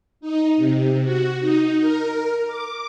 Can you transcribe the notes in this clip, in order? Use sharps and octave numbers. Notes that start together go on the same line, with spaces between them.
D#4
C3
F#4
D#4
A#4
D6